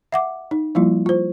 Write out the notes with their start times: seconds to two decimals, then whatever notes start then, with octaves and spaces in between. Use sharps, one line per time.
0.12 E5 F#5 D6
0.51 D#4
0.75 F3 G3 A#3 E4 F4
1.06 F4 C5